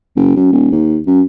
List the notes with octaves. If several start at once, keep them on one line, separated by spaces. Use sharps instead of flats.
F#1
F#2
D#1
D#2
F#2